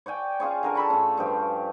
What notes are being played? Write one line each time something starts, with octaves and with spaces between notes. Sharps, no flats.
C#5 D5 G5 G#5
C#4 F4 G#4 C#5
D3 A#4 G#5
A4 B5 C#6
A2 C#4
G2 F3 G4 A5